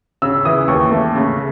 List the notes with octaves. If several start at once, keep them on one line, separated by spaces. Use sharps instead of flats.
C#3 E6
E3 D#6
D#2 C#6
A3
C#3